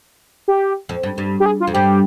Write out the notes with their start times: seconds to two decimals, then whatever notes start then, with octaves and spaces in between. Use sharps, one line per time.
0.48 G4
0.89 F2
1.03 G2
1.18 G2
1.40 G4
1.46 G#4
1.60 F4
1.67 F2
1.74 G2 G4